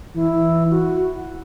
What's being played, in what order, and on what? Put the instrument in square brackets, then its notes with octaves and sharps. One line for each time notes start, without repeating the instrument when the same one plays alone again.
[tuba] E3 [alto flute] E4
[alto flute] F#4